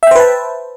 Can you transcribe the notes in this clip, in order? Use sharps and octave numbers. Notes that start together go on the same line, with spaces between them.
B4 C5 E5 G5 A5